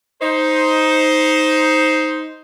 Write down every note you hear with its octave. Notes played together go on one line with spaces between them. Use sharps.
D#4 C5